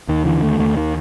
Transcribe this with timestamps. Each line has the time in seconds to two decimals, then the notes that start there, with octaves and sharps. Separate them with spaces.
0.08 D#2 D#3
0.25 D3 E3
0.42 D#2 A3
0.59 D#2 A3
0.77 D#3